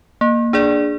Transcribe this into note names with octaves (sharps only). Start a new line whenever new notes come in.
A#3
D4 G#4 D5